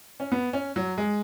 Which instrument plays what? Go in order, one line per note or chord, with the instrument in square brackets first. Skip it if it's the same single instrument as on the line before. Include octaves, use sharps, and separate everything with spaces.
[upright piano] C#4
B3
C#4
F#3
G#3